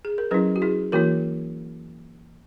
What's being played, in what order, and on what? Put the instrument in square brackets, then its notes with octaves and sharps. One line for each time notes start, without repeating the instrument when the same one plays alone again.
[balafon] G#4
A#4
F#3 C#4 E4 G#4 B4
F#4
E4 G#4
E3 A#3 E4 F#4 A#4